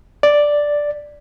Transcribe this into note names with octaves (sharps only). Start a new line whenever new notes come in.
D5